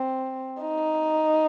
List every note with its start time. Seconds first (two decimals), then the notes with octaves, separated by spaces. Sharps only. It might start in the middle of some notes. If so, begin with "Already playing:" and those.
Already playing: C4
0.62 D#4